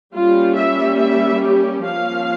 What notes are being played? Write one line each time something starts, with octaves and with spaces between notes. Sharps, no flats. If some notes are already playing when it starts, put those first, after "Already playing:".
G3 A#3 C#4 F4
E5
E5
G4
F3 A#3 C#4 F5